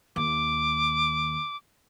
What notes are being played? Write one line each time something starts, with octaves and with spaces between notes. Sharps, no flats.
D#2 D6